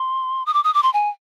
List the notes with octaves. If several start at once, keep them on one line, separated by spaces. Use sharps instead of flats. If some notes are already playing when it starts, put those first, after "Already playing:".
Already playing: C6
D#6
D6
D#6
D6
C6
G#5